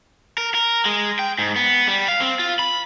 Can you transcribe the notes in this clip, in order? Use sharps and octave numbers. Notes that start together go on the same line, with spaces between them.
A#4
A#4
G#3
G5
G#2
B3
G3
F5
C4
F4
B5